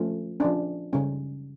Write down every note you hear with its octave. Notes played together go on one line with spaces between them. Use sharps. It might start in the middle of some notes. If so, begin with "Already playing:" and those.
Already playing: F3 A3 C#4
F3 C#4 D4
C#3 G3 C#4